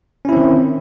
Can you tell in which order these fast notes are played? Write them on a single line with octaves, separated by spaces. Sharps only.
C#4 E4 C4 D#3